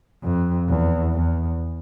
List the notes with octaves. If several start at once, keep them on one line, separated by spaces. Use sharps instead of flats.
F2
E2
E2